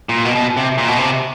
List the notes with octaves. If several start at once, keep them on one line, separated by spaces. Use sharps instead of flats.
A#2
B2
B2
C3
A#2
B2
C3